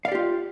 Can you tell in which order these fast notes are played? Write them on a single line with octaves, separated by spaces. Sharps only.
F5 D5 G4 F4